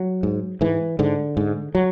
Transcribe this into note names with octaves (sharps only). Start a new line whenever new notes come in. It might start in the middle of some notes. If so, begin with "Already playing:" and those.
Already playing: F#3
G#2
G#2 E3
G#2 D3
G#2
F#3